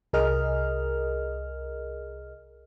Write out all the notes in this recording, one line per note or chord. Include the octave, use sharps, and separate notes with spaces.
C2 G#4 A#4 D#5 F6